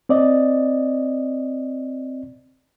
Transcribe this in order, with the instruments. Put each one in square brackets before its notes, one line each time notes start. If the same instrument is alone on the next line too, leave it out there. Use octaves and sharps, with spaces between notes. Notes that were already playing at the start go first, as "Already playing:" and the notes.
[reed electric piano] C4 D5 D#5